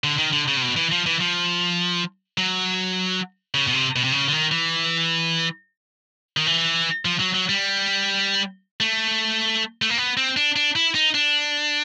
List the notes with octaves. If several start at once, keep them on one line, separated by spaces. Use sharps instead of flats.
D3
D#3
D3
C#3
C3
B2
E3
F3
E3
F3
F#3
C#3
B2
C3
B2
C3
C#3
D3
D#3
E3
D#3
E3
F3
F#3
F#3
G3
A3
A3
A#3
B3
C4
D4
D4
E4
D#4
D4